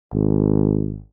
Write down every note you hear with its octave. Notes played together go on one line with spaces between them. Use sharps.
G#1